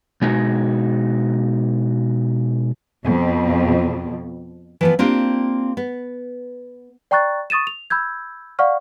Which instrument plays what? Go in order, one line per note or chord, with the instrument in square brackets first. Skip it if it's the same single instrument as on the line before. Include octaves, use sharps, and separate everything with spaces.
[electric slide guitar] B2 G#3 D#4 F#4
[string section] F2 B2
[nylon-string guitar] E3 F3 B3
A#3 C4 D4 F4 G4
B3
[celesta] D5 G5 A#5 C#6 F#6 A6
C#6 D#6 A6 D#7 E7
F7
B5 E6 G6 G#6
D5 F5 F#5 C#6 F6